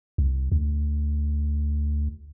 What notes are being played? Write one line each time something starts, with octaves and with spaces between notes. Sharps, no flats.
C2
D2